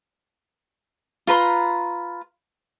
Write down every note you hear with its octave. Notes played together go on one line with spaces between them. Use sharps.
F4 B4 A#5 C6